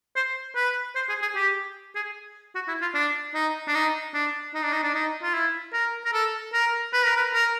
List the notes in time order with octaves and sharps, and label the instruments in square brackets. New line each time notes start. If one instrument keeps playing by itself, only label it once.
[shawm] C5
B4
C5
G#4
G#4
G4
G#4
F#4
E4
F4
D4
D#4
D4
D#4
D4
D#4
D4
D#4
D4
D#4
F4
E4
A#4
A#4
A4
A#4
B4
A#4
B4
A#4